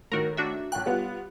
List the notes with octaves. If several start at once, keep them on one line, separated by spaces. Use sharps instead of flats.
A2 D#3 F#4 A#4
D4 F#4 E5
B1 G5 F#6
G3 B3 F4